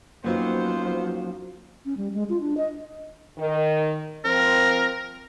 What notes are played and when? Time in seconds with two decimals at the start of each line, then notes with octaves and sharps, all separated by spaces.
0.24 F2 F3 F#3 A#3 B3 C#4 D#4 C5
1.85 C#4
1.97 G3
2.14 G#3
2.29 F4
2.41 D4
2.57 D#5
3.38 D#3
4.25 F3 C4 A#4